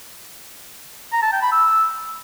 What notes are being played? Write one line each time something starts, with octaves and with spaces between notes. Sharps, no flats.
A#5
A5
G5
B5
E6